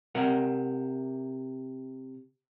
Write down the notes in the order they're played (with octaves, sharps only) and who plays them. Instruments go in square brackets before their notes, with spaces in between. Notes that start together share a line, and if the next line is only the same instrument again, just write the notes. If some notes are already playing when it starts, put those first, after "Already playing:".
[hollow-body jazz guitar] C3 A#4 F#5